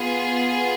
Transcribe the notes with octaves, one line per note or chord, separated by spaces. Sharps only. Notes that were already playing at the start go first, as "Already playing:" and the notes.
Already playing: B3 F4 G#4